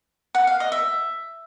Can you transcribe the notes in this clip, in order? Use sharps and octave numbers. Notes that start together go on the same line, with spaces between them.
F#5
F5
D#5
E5